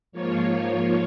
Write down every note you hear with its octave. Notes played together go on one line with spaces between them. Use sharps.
G#2 F3 A#3 F4 C#5
C#5